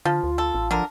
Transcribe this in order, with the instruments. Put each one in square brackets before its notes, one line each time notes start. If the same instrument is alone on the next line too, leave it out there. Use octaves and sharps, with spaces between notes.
[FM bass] D3 [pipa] F3 [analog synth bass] F4
[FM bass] D2
[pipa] A4
[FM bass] A1
[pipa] D3 A#4 [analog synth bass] F3